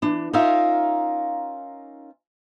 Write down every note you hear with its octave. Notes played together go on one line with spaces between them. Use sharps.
E3 D4
C#4 D#4 F4 A#4 E5 F5